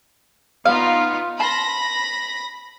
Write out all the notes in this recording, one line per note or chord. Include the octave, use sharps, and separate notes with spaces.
B3 D#4 F4 F5
A5 B5 C6 A#6